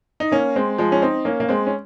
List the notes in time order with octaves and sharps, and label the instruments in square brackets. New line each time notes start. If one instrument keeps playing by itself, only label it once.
[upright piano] D#4
A#3 C#4
G#3 C4
F3 G#3
C#4
C4 D#4
A#3 C#4
A#3
G#3 C4
C#4